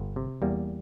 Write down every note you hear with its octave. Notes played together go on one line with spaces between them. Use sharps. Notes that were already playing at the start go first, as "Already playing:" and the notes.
Already playing: G1
C3
E2 G3 A#3